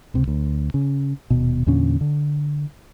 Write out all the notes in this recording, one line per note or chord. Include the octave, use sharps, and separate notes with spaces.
C#2 C3
D2
C#3
D#1 B2
E2 A#2 D3 C#4
D3